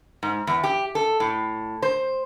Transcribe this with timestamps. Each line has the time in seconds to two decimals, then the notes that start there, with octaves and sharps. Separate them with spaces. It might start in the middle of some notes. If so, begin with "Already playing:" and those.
0.23 G#2
0.47 E2
0.64 G4
0.95 A4
1.20 A2
1.82 C5